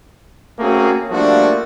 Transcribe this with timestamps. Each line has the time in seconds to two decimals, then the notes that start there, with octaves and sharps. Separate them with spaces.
0.59 A3 A#3 C4 C#4 F#4 G#4
1.10 F3 G3 A3 A#3 D4 F#4